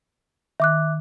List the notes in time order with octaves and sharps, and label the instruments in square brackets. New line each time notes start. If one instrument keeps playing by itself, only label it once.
[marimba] D#3 [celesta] E5 D6 F#6